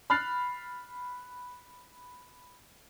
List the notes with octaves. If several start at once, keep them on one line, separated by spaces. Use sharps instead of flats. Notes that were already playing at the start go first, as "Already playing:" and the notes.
B5 F6 F#6 A6 C7